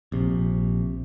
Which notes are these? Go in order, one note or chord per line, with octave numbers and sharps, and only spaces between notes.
A#1 C3